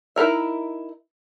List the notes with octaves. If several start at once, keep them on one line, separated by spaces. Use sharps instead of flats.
D#4 E4 A#4 E5